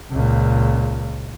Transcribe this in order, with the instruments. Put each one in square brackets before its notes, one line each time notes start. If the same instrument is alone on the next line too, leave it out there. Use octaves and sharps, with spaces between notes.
[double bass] C#2 A#2